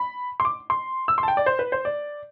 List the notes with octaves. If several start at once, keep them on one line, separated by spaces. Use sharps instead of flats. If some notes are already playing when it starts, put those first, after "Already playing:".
Already playing: B5
C6
D6
C6
E6
C6
A5
G5
D5
C5
B4
C5
D5